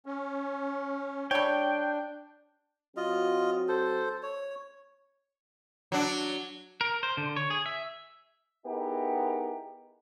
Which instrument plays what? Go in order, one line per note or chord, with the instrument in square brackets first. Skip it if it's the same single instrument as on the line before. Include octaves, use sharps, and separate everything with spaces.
[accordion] C#4
[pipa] G3 C#5 [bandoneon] D4 [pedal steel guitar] G5
[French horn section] F#3 C4 F#4 [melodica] F4 D#5
[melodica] A4 C5
C#5
[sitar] F#3 D4
[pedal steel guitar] A#4
C5
D3
C#5
G#4
E5
[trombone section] B3 D#4 E4 G4 G#4 A#4